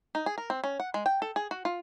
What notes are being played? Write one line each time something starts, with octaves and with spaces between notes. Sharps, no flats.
D#4
G#4
A#4
C4
C#4
F#5
G#3
G5
A4
G#4
F#4
F4